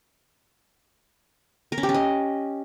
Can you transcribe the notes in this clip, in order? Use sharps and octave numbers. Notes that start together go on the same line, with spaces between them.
A#4
C#4
G4
C#4
D#5